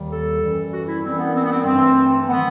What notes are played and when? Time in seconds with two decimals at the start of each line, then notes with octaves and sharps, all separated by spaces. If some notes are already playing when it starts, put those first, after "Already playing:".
Already playing: D#2 D#3 G3
0.10 A4
0.41 F#2 E3 G3
0.71 F#4
0.87 E4
1.02 F#2 E3 G3 C4
1.18 B3
1.34 C4
1.44 B3
1.50 C4
1.65 G2 E3 A3 C4
2.28 D#3 F#3 A3 B3